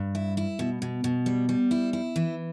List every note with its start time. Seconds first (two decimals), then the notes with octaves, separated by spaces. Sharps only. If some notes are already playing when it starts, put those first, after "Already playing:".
Already playing: G2
0.15 E4
0.37 E4
0.59 B2
0.82 B2
1.04 B2
1.26 G3
1.49 G3
1.71 E4
1.93 E4
2.16 E3